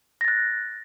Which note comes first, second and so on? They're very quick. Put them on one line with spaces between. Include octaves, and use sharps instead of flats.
A#6 A6 F#6